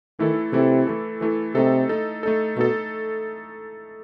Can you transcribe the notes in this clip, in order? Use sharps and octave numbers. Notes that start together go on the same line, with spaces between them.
D#3 E3 A3 E4 A4
C3 E3 A3 E4 A4
E3 A3 E4 A4
E3 A3 E4 A4
C3 A3 D#4 A4
A3 D#4 A4
A3 D#4 A4
B2 A3 D#4 A4